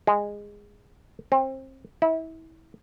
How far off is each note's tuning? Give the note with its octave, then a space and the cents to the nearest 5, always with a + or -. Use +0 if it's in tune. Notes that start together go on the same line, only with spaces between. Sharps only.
G#3 -15
C4 +30
E4 -30